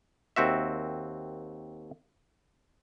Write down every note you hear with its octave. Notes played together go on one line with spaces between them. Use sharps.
D#2 C4 F#4 E5